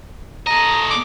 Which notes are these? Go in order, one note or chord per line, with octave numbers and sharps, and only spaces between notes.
A3 D#5 A#5
D6